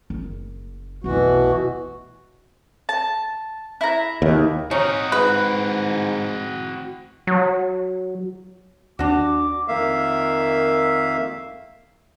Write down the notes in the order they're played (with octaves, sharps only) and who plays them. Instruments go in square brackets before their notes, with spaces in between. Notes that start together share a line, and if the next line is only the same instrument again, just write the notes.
[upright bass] F#1
[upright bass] F1 B1 [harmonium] B2 E3 F#4
[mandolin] A5
E4 A#5
[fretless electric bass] D#2
[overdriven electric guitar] C4 F#4 [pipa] C#4 [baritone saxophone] D#4
[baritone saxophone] G#2 [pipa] B4
[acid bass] F#3
[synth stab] D#2 [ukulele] D4 F#4 [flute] D6
[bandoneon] F2 D#3 A#3 E5 F5